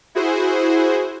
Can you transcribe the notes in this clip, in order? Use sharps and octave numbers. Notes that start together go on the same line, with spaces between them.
E4 F#4 G#4 C5